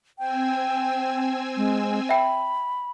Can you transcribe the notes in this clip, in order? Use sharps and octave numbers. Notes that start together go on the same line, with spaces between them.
C4 G5 G#5 E6
G#3
E5 G5 B5